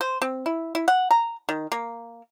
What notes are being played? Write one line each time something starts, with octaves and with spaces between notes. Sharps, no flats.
C5
C4
E4
E4
F#5
A#5
D#3
A#3